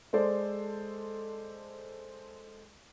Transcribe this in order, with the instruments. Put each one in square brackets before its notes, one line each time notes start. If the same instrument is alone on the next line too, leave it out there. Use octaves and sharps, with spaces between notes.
[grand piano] G#3 A4 C5 D5